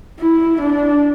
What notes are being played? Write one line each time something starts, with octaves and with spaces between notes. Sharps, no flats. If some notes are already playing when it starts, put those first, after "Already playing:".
E4
D4